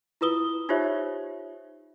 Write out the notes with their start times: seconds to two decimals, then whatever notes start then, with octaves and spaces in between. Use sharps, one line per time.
0.21 E4 F4 B4 D#6 G7
0.69 D#4 F4 G4 C5 C#5 E5